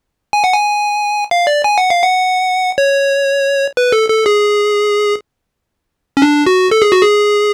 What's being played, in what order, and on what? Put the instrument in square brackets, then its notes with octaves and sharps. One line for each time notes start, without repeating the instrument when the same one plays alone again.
[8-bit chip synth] G#5
F#5
G#5
F5
D5
G#5
F#5
F5
F#5
C#5
B4
A4
A4
G#4
C#4
D4
F#4
A4
G#4
F#4
G#4